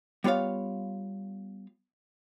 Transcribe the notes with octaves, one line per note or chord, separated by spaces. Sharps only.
G3 B3 F4 C#5 F5